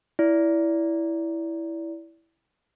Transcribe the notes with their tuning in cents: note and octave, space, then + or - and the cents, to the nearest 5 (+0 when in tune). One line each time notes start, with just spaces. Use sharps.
E4 +0 D5 -25